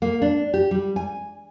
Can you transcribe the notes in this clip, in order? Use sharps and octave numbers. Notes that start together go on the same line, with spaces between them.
A#3
D4
G4
G3
G#5